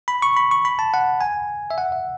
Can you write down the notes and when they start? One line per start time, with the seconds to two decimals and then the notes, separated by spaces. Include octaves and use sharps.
0.08 B5
0.22 C#6
0.37 B5
0.51 C#6
0.65 B5
0.79 A5
0.94 F#5
1.21 G#5
1.71 E5
1.78 F#5
1.92 E5